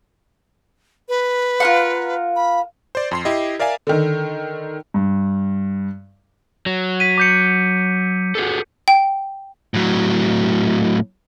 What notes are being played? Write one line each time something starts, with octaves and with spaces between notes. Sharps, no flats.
B4
F4 A#4 F#5
B5
C5 D5
F2 C6 C7
E4 G4 D#5
A#4 D5 E5 F5 G#5
D3 D#3
G2
F#3
B6 D#7
D6 G6 C#7
F#4 G#4 A4
G5
A2 F#3